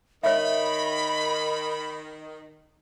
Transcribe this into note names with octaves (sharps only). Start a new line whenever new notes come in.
D#3 C#5 E5 B5